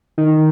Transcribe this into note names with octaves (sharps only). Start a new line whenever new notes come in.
D#3